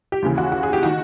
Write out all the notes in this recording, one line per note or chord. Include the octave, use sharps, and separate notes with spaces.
G4
D#2 C#3 E3
F#4
F#4
G#4
G4
D#3 F#4